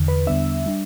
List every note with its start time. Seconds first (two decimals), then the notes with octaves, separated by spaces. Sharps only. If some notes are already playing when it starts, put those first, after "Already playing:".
Already playing: E2 D3
0.08 B4
0.27 E2 D3 G3 B3 D4 E5
0.66 G3 D4